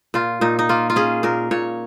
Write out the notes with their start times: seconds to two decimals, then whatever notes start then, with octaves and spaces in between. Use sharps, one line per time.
0.14 A#2 F4
0.41 A#2 D#4
0.59 D#4
0.69 A#3 F4
0.90 F4
0.96 C#4 G#4
1.23 A#2 A#4
1.51 A#2 C#5